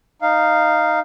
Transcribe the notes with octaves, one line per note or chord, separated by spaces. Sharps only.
D#4 F5